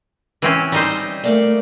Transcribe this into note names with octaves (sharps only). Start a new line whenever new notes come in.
E3 C4 C#4
G3 D#4 C5
A3 A#3 D5